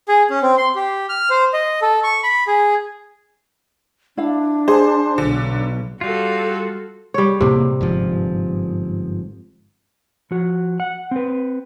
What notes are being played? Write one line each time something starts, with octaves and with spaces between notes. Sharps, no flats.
G#4
C#4
C4
C6
G4
F6
C5
D#5
A4
C#6
B5
G#4
D4 E4 F5
G#4 C5
B1 D3
G3 F4 F#4 A4
G3 C#5
E1 A2 C3 A#3
G1 G#2 F3
F3 F#4
F#5
C4 B4